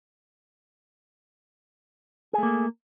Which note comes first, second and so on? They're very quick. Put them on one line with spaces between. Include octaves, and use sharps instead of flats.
G#4 A3 A#3